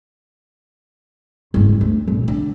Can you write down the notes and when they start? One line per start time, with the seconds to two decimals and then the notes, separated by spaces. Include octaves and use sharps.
1.54 F#1 G#2
1.81 D2
2.07 A#1 A#2
2.28 D3